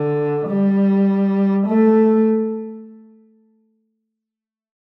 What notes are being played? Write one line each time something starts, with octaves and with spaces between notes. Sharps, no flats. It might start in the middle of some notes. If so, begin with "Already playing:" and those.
Already playing: D3
G3
A3